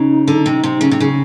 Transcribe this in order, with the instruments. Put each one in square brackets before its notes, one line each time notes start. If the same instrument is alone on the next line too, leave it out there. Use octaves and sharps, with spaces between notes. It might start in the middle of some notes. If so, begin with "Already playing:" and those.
Already playing: [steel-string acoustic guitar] C#3 [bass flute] D#4
[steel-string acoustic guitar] D3
C3
C3
C#3
C3
C#3